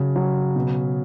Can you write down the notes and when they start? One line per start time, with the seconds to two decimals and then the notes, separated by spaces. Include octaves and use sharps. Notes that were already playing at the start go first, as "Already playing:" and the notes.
Already playing: C#3 F#3
0.16 F#3
0.56 B2